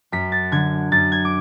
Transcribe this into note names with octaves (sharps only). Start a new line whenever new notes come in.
F#2 B6
A6
D3 F#3 G#6
F#2 A6
G#6
D6